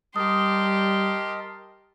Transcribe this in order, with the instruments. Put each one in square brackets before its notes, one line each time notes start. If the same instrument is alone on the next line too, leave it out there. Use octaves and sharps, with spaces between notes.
[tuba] G3 [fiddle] G4 C6 [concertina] A#4 D#5 A5 [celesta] D#6